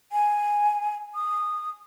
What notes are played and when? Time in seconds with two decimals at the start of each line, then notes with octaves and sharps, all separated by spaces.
0.12 G#5
1.15 D#6